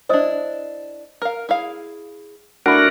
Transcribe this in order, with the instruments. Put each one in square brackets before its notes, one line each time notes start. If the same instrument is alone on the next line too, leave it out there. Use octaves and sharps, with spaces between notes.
[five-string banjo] D4 E4 [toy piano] C5 D#5 D#6
[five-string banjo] A#4 F5
E4 G#4 F5
[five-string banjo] A3 E4 [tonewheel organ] D4 F#4 A#4 [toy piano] F#5 B5